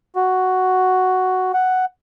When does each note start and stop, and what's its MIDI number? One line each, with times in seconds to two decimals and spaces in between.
0.16 1.52 66
1.54 1.85 78